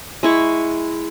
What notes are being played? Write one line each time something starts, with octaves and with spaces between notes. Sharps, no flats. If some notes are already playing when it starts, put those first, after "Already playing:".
G#3 E4 C#6